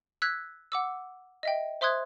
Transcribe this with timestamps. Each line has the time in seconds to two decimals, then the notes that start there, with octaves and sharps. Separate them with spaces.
0.22 E6 F#6 G#6 B6
0.72 F#5 D6 E6
1.43 D#5 E5 G5
1.81 C5 E5 C6 D#6 F#6 G#6